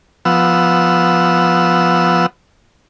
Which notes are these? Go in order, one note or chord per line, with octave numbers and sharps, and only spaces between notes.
F3 B3 F#5 E6